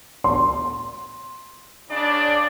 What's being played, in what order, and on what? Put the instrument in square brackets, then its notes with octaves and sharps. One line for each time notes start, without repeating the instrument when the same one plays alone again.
[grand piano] C6
[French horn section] C#3 D4 D5